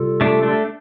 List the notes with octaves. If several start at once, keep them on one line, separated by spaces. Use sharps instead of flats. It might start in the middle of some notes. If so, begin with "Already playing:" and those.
Already playing: C3 G3 F4 A4
A3 D4
A3 D4